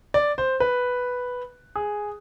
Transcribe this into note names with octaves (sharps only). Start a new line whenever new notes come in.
D5
C5
B4
G#4